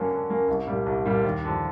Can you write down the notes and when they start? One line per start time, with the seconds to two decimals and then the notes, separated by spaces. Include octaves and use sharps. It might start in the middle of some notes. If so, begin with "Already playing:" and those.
Already playing: D3 F#3 A#3 C#4
0.11 D3
0.30 F#3 A#3 C#4
0.48 C2
0.67 A#2 G3
0.86 C2
1.06 A#2 G3
1.24 D#2
1.44 D3 F3